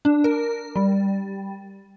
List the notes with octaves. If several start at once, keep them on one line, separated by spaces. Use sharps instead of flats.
D4
A#4
G3